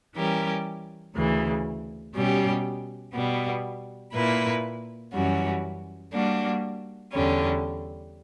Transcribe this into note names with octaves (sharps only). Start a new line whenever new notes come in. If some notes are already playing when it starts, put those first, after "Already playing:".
E3 G3 C#4 G4 A#4
D2 C#3 E3
B2 G3 C#4 G4
B2 G3 B3
A#2 A#3 E4 B4
F#2 E3 G3 C#4 F#4
G3 A#3 D4 F#4
E2 D3 G3 C#4